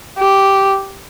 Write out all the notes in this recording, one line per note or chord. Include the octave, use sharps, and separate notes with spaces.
G4